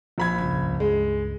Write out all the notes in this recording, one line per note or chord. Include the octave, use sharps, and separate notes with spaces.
A#1 B5 G#6
C#2 G2
G#3